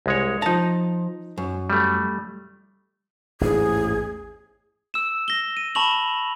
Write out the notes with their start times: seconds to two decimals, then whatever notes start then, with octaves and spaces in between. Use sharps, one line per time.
0.06 C2 G#3 C#5
0.42 F3 D#4 A5 A#5
1.38 F#2
1.70 G3 A3
3.41 A1 E2 G#2 G#4
4.94 E6 E7
5.28 A#6 G7
5.57 D#7
5.75 A5 B5 C#6 F7 F#7